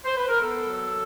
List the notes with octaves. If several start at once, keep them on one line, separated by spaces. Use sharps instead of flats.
C5
B4
A#4
B3 A4
F#3